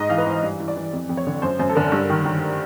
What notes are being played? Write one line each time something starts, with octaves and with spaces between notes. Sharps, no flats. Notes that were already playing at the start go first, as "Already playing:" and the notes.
Already playing: G#2 D#5
E3 F5
B4
E3 C5
G2
E3
D5
E3
F2
F2
C#5
D3
F#2 C5
F#2 C5
A4
D3 A#4
G2
D#3
D#3